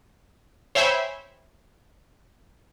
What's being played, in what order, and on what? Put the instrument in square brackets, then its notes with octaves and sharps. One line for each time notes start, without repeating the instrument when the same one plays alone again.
[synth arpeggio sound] C5 C#5 E5 G5 G#5 B5